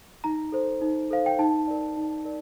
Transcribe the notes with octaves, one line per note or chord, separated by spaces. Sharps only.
D#4 A#5
A4 C5
D#4
A4 C5 F5
G5
D#4 A5
A#4 D5
D#4
A#4 D5